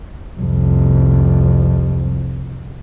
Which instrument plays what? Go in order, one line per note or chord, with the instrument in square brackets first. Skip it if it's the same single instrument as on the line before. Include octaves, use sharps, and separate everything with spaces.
[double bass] C2 F2